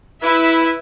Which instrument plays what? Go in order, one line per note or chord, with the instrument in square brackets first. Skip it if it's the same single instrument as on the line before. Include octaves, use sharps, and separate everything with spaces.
[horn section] E4 [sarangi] B4 [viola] E5